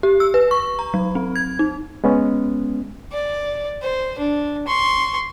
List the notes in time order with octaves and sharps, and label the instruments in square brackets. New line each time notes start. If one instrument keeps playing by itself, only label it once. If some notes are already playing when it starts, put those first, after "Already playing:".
[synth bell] G4
E6
B4
C#6
A#5
F#3
C4
G#6
D#4
[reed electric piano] G#3 B3 C#4
[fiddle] D5
C5
D4
C6 C#6